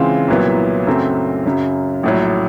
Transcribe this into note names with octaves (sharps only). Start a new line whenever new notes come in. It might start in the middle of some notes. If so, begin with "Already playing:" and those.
Already playing: C#3 E3 G#3 C4 F4
C2 A#2 F#3 B3 E4
F#2 C#3 F#3 A3 C4
F#2 C#3 F#3
A#1 A2 F#3